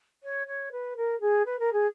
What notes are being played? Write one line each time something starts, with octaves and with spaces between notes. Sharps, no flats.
C#5
C#5
B4
A#4
G#4
B4
A#4
G#4